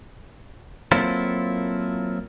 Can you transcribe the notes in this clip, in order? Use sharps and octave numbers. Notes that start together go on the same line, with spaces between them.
F#3 A#3 C4 E4 F4 A4